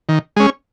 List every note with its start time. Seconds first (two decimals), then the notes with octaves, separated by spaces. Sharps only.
0.09 D#3
0.36 G#3 C#4